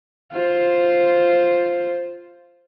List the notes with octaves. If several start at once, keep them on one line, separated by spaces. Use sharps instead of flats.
F4 C5